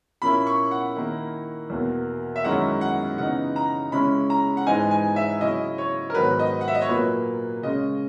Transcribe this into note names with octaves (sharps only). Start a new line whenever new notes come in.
A#2 A#3 C#4 E4 B5
C#6
F#5
D#3 A#3 E4
E2 B2 A#3
E5
F#2 D#3 G#3 C#4 E4 F#5
F#5
C#3 E3 B3 D#4 F#5
A#5
C#3 G#3 C#4 E4 B5
A#5
F#5
G#2 E3 G#3 D#4 G#5
G#5
E5
C#3 F#3 C#4 E4 D#5
C#5
A#4
G#2 D#3 F#3 B3 B4
D#5
F#5
E5
D#5
C#5
A#2 F#3 A#3 B4
C#3 G#3 C#4 D#5